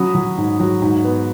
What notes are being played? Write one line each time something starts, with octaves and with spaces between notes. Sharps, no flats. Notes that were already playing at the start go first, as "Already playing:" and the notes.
Already playing: F#3 C#4 B5 D#6
F#3
G#2
F#3
G#2
B3